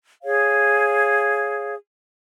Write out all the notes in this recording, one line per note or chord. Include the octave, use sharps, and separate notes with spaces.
G#4 C#5 F5